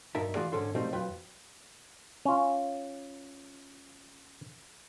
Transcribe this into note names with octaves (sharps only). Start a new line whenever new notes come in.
B1 G2 D#4 A#4 E5 A5
E3 F4 F#4 G#4 D5
G#2 D3 C#4 A4 C6
B2 F3 G3 A3 C4 D#4
F2 F#3 F4 B4 G5
C#4 F4